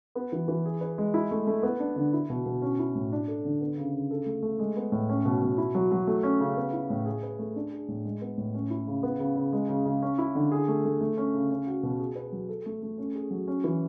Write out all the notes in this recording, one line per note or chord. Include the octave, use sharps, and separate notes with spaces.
B3
E3
E3
G#4
B4
G#3
E4
A3
A3
B3
D4
D3
E4
B2
B2
C#4
E4
A2
D4
A4
D3
B3
C#3
C#3
A4
A3
A3
G#3
B3
A2
C#4
B2
B2
E4
F#3
F#3
A3
C#4
C#3
B3
E4
A2
G#4
B4
A3
D4
G#4
A2
G#3
B3
A2
C#4
E4
C#3
B3
C#3
C#3
G#3
C#3
C#3
C#4
E4
D3
G#4
A3
A3
A3
C#4
C#3
C#4
F#4
B2
G#4
B4
F#3
A4
A3
A3
C#4
G#4
F#3
C#4
E3